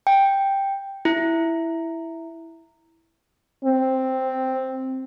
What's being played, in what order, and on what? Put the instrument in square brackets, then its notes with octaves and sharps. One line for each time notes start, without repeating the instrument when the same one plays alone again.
[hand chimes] G5
E4
[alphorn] C4